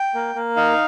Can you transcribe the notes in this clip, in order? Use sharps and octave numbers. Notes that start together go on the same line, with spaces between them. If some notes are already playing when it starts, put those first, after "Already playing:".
Already playing: G5
A#3
A#3
D#4 F5